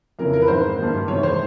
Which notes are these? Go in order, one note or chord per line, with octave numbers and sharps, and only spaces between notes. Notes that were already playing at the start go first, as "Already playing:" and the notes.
F2 C#3 E3 A#4
A#4
B4
G#2 D#3 G#3 C5
G2 D#3 G3 A#3
E2 C3 D#3 G#3 C#5
C5